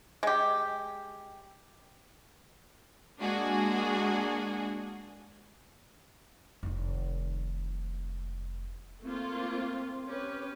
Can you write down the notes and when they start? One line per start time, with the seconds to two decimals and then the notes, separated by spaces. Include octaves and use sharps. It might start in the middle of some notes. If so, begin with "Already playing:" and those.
0.23 G#3 G4
3.20 G#3 A#3 D4 F#4 G#4
6.63 F1 D#3
9.03 A3 A#3 C4 F4
10.05 C#4 G4 B4